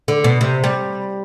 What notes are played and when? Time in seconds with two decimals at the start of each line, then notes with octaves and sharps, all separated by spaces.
0.08 D3
0.24 B2
0.41 C3
0.64 G3